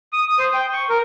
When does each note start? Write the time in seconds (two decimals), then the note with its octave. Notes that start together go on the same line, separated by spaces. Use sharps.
0.13 D#6
0.28 D#6
0.39 C5
0.54 G5
0.73 C#6
0.90 A#4